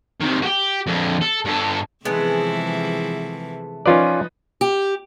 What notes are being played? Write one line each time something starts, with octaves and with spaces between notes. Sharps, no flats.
C3 D#3
F#4 G4
F2 D3
A4
G2 A4
C3 E3 F3 G#3 A3 B3
F3 C#4 D#4 F4 B4 D5
G4